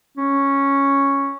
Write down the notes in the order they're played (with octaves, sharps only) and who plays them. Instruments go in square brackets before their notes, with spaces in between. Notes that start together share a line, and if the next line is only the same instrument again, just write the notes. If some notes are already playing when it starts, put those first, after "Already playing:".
[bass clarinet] C#4